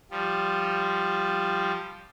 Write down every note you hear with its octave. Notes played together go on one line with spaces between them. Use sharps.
F3 G3